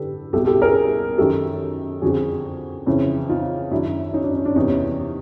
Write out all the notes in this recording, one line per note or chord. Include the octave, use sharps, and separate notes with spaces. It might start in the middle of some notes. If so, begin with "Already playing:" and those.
Already playing: D3 G4 A4 B4
C2 B2 G4 A4
G4 A4
G#4 A#4
F#2 D#3 G4 A4
F2 D3 F#4 G#4
F2 C#3 E3
D#4 F4
F#2 D#3 D4 E4
C#4 D#4
D4
C#4
D4
E2 C3 E3 C#4 D#4